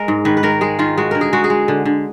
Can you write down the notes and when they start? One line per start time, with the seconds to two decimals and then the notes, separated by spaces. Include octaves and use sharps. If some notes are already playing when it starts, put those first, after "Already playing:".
Already playing: G#3 A#4
0.08 G#2
0.25 D#3 B4
0.37 B4
0.43 D#3 A#4
0.61 G#3 G#4
0.79 D#3 F4
0.98 G#3 F#4
1.11 D3 A#4
1.21 G#4
1.33 G#3 F#4
1.44 G#4
1.50 G#3
1.68 D3
1.85 D3